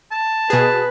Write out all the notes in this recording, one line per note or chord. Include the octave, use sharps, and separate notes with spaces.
A5
B2 G#4 B4